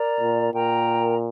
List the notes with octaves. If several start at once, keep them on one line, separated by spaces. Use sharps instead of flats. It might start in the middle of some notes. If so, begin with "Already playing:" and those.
Already playing: A#4 D5 A#5
A#2
A#2 A#4 G5 A#5